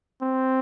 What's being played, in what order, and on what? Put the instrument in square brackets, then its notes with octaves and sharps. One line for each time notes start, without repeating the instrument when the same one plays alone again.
[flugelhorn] C4